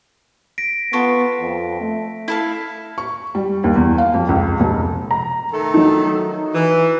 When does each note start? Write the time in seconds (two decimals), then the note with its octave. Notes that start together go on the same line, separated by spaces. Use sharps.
0.58 A#6 B6 D7
0.93 B3 F4 A4 C#6
1.40 F2
1.81 A3
2.28 E4 A4 F5
2.98 C#6
3.35 G3
3.64 D#2
3.76 E2
3.98 F5
4.14 F2
4.29 C#2
4.60 F1
5.11 A#5
5.53 D#3 A3 A4
5.74 F#3 D#4
6.54 E3